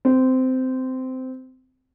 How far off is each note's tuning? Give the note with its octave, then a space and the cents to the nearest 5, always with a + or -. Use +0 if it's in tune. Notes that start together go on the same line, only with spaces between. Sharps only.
C4 -15